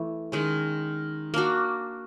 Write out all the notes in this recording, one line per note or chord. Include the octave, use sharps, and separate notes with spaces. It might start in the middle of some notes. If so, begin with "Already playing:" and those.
Already playing: E3 A3
D#3 G#3 C#4
A#3 D4 F#4